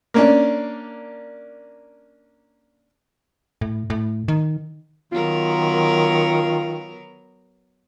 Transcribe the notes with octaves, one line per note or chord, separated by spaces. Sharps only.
A#3 C#4 D4
A2
A2
D#3
D#3 F#3 B3 F4 A#4